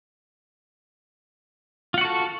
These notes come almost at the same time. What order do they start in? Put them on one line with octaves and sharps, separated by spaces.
F4 F#5 F#4 A4